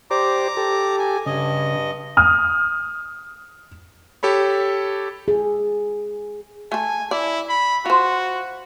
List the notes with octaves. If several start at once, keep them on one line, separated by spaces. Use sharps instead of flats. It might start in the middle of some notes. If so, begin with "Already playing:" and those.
G4 C5 D5 A#5 D6
G4 A4
G#5
G2 C#3 D#5
D#6 F6
G4 A4 C#5 B5
G#4
A3 A4 G#5
E4 D5
B5
F4 F#4 C5